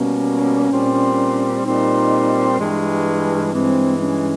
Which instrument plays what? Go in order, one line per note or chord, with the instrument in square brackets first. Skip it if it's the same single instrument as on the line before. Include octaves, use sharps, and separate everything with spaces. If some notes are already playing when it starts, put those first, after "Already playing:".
Already playing: [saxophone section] B2 G3 A#3 [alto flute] C#4
[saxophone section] A#2 G3 C4
[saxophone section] A#2 G3 C4 [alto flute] D#4
[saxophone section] G2 E3 G#3
[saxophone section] G2 E3 G#3 [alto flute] C4
[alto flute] C#4